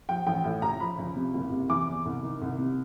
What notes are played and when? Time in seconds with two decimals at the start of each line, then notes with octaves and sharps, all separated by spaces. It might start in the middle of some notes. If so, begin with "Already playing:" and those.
0.09 F3 G5
0.27 A1 G5
0.44 A2
0.62 C#2 A#5
0.80 F3 B5
0.99 C#2
1.16 C3
1.34 F#1
1.51 C3
1.69 E3 D6
1.88 E2
2.06 C2
2.23 D#3
2.42 C2
2.58 C3